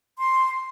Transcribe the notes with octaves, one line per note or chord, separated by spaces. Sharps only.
C6